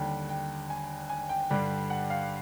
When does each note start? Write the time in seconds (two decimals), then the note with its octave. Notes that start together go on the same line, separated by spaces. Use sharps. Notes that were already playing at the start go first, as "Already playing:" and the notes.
Already playing: D#2 D3 G3 G5
0.29 G5
0.70 G#5
1.09 G#5
1.29 G5
1.50 G2 D3 G3
1.90 F#5
2.10 F5